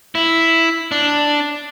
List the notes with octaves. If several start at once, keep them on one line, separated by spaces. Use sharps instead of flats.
E4
D4